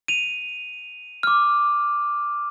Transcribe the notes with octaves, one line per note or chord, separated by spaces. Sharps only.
D#7 F7
D6 F6